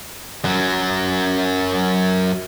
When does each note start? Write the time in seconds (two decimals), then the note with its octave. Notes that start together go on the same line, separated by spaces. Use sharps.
0.44 F#2 F#3